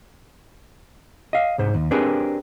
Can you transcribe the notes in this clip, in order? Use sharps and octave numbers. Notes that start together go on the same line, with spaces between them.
D#5 F5
C2 G#2 C5
D#2
C4 D4 G4 G#4 A#4 B4